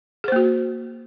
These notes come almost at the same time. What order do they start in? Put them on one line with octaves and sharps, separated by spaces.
G#4 C5 A#3 F#4